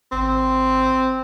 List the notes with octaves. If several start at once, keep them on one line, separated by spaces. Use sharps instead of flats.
G#1 C4